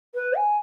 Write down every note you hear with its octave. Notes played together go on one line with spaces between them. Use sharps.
B4
G#5